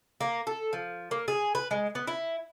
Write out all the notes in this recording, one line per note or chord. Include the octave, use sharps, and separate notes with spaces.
A#3
A4
F3
A#3
G#4
B4
G#3
B3
E4